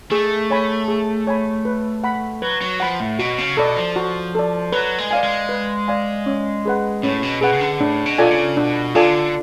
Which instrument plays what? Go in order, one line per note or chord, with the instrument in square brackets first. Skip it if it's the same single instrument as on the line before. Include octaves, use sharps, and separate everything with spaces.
[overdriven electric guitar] A3 [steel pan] G#4
[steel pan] C#5 G#5 B5
G#4
C#5 G#5 B5
B4
F#5 B5
[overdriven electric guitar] F#3 [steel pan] B4
[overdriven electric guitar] F#3
[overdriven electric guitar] F3 [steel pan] F#5 B5
[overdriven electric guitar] A2
[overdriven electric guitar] B2 [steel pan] F#4
[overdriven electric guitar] C#3
[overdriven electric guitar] B2 [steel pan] A4 D5
[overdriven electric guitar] F3
[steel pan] F#4
A4 D5
[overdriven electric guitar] F#3 [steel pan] B4
[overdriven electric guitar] G#3
[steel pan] D5 F5 G#5
[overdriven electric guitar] G#3
[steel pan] B4
D5 F5 G#5
C#4
G#4 B4 F#5
[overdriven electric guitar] A2 [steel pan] C#4
[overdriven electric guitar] B2
[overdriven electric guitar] B2 [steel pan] G#4 B4 F#5
[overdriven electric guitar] C#3
D3
[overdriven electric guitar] A2 [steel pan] D4
[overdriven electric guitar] B2
[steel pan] F4 A4 D5 G#5
[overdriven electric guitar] C#3
[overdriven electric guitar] B2 [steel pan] D4
[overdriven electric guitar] D3 [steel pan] F4 A4 D5 G#5